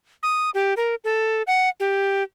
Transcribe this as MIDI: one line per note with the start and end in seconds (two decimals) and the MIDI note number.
0.23 0.50 87
0.54 0.74 67
0.77 0.95 70
1.04 1.42 69
1.47 1.69 78
1.80 2.23 67